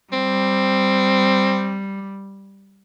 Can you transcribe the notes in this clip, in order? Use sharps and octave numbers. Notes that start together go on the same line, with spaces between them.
G3 C4